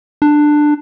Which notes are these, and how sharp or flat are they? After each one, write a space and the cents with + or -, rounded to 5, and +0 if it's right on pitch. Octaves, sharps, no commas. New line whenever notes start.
D4 +15